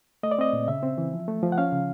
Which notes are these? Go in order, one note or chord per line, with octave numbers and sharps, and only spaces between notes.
A3 D#5
D5
C4 D#5
A#2
C#3 E5
C4
E3
F3
A3
F3
F#5
C#4 F5
C#3